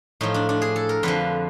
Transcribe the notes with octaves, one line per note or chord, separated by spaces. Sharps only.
A2 F3 D#4
D4
D4
G#4
A4
A#4
F2 D3 F3 B4